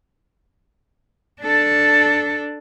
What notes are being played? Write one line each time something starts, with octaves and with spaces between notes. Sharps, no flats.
D4 A4